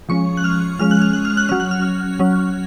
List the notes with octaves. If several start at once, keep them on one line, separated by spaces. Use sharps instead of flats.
F3 G#3 C#4 C#6
F#6
F6
F3 G#3 C#4 F6
F#6
F6
F#6
F6
F#6
F#3 C#4 F6
F#6
F6
F#3 C#4